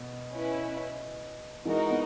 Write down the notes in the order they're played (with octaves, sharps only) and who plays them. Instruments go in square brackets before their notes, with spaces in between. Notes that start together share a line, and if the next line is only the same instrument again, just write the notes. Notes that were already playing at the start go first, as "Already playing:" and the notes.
Already playing: [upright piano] B2
[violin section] C#4 E4 B4
[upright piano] E3 G#3 [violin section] D#4 F#4 A#4
[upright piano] B3